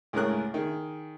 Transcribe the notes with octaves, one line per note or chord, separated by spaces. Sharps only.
C#2 A2 G#4 A#4 F#6
D#3 G#4